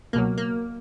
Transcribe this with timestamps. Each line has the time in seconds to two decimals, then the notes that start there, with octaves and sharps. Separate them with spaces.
0.13 C#2 B2 F#3 A#3
0.38 A#3